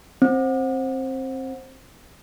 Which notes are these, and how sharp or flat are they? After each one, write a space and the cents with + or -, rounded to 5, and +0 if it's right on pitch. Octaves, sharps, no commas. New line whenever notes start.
C4 +15